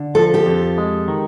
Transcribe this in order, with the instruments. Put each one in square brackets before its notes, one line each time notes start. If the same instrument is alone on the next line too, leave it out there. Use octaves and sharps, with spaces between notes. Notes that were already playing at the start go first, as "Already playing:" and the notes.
Already playing: [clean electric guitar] D3
[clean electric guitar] F3 [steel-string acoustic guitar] A4
[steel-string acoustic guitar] G4 A4
[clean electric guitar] F2
G#3
D#3